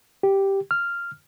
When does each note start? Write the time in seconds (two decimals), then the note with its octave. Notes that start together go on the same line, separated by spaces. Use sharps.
0.23 G4
0.71 F6